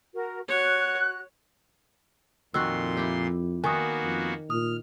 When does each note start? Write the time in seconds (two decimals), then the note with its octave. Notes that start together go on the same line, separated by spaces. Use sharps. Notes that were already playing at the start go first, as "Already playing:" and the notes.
0.14 F#4 A#4
0.48 F#4 C#5 F#6
2.54 F2 A#2 D#3 F#4 C6 E6
2.97 E4 G4
3.64 D#3 A#3 B3 F#4 G#5 C#6 D#6
4.03 F2
4.50 A#2 D#6 F6